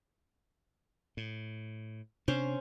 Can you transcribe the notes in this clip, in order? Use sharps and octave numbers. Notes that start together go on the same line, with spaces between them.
A2
C3 C#4 D4 C5